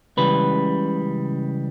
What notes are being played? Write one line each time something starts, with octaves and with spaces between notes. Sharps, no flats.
C#2 C#3 E3 G3 B4